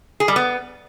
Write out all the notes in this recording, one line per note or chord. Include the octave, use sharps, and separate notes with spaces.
G#4
G3
B3